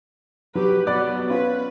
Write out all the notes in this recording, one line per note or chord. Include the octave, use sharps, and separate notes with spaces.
F#3 G4 B4
F#3 B3 D5 B5 F#6
C#4 F4 B4